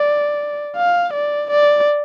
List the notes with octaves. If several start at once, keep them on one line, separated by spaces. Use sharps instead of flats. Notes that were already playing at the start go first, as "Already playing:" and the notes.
Already playing: D5
F5
D5
D5